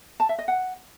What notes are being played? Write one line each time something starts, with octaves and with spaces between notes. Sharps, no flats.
A5
E5
D#5
F#5